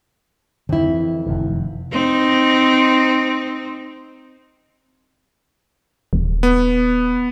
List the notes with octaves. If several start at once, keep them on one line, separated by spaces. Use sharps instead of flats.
F2 D3 D#3 E4
E3
F1 F#2 D#3
C4 D#4
D#1
B3